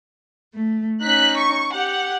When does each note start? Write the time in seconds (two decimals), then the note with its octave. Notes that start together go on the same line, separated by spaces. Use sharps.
0.54 A3
1.01 C#4 D#4 F#6 B6
1.37 C#6
1.74 G4 F#5